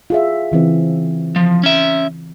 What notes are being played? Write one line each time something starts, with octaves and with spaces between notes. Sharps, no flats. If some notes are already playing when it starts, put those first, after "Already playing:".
F4 G#4 E5
C#3 E3 C4
F3
C#4 E5